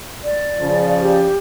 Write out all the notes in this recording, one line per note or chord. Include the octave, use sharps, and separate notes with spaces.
D5
C#3 F3
G4